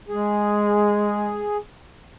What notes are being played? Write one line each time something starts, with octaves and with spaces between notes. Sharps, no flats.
G#3 G#4